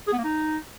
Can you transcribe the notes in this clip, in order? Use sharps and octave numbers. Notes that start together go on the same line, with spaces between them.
G#4
B3
A#3
D#4